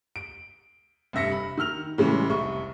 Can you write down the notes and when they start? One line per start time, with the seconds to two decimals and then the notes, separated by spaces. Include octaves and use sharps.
0.16 D7
1.13 F1 G2 E5 A#6 C#7
1.32 B5
1.58 D#3 E6 F6 F7
1.98 A2 C#3 E3 G3 G#3
2.29 F1 C2 C#6